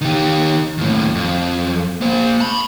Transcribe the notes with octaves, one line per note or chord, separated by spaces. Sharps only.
D#3 G4
D#2 A2
F2
A#3 C5
A5 B5